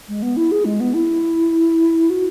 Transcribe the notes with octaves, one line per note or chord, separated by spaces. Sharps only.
G#3
B3
E4
G#4
G#3
B3
E4
F#4